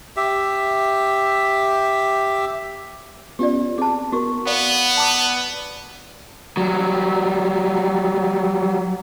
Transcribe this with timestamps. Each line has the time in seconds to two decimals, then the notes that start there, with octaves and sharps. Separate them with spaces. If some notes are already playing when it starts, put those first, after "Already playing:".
0.16 G4 E5
3.39 B3 C#4 F4 G4 D5
3.78 C4 G#4 A5
4.12 B3 F#4 A#4 C#6
4.47 B3 D5 F5
4.97 A5 D6
6.57 F#3 G3